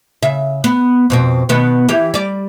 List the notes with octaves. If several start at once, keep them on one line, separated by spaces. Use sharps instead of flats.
C#3 E5
B3
F2 B2 C4
B2 D#3 B3
E3 G4
G3 D5